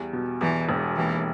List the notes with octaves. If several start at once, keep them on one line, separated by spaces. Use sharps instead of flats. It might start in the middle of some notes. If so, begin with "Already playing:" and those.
Already playing: E2 G3
B2
E2 E3
E1
D#2 E3